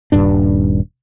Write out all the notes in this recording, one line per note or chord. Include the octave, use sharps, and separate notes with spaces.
D#1 G2 D4